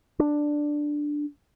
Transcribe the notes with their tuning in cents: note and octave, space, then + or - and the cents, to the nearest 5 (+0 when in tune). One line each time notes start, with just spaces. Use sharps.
D4 +5